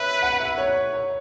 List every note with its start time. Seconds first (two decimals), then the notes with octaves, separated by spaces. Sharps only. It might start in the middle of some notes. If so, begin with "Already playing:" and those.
Already playing: B4 C#5 E5
0.22 F#5
0.40 E5
0.58 C#5
0.94 C#5